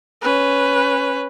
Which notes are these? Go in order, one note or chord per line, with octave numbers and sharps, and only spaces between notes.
C#4 B4